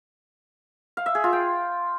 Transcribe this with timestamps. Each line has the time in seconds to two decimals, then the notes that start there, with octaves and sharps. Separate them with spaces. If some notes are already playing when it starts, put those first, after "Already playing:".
0.97 F5
1.06 E5
1.15 G#4
1.24 F4
1.33 G5